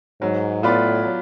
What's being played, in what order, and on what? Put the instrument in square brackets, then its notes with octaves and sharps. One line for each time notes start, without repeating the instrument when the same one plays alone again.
[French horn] G#2 [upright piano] F#3
[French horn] A2 [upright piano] B3 F4 B4 D5
[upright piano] F#3